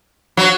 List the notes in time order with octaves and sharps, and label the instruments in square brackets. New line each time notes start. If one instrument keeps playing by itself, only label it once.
[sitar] F#3